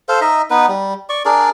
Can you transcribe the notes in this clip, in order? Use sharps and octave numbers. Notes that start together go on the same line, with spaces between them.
A4 C5 F5
D#4 D#5 E5
B3 D#4 B4
G3
D5 C#6
D4 G#4 A#4 D5